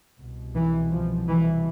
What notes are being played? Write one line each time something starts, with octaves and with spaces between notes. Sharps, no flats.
C2 B2
E3
F3
E3